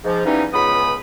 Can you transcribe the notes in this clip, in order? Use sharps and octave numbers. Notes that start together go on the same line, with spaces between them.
G#2 F3
E3 F3 G3 B3 C#4 D#4
C#2 B3 B5 D#6